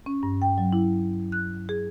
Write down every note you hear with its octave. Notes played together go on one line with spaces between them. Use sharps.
C#4
G2
G5
F#3
E4
F#6
G#4